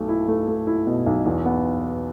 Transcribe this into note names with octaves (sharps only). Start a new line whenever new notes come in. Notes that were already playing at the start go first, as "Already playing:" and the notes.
Already playing: B1 A3
E4
A3
A3
E4
B2
B1
E2
B3